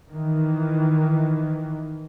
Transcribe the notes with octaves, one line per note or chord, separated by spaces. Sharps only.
D#3 E3